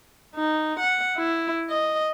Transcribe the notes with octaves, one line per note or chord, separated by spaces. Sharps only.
D#4
F#5
E4
D#5